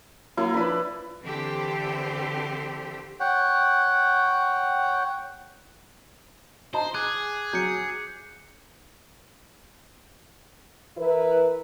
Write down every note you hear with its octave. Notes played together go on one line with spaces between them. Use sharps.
F#3 A#3 E4
F3 D4 B4 B5
D3 E3 C4 G4 A4
C#5 F#5 G5
C5 D#5 A5 A#5
G#4 D6 F#6 G#6
F#3 G6 C#7
E3 E4 A#4 B4